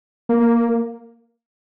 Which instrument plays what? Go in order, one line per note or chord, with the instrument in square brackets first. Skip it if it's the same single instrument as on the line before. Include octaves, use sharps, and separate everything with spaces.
[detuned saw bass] A#3